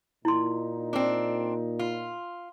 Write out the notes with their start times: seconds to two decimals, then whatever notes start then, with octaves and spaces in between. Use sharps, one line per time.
0.25 A#2 D#4 E4 C6
0.93 C4 D4
1.79 F4